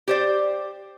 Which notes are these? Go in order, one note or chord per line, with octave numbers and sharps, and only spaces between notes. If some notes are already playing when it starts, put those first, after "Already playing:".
G4 C5 D5